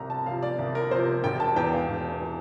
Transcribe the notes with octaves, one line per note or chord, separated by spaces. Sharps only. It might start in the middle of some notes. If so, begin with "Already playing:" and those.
Already playing: C2 C3 F3 A#5
A5
C3 F3 F5
D5
C2
A#4
C3 F3 C5
E1 G5
A5
E2 E3 G5
F5
E1
E3